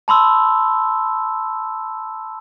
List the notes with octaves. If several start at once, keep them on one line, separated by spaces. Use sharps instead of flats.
A5 B5 C6 E6